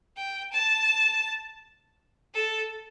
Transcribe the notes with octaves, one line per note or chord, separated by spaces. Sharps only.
G5
A5
A4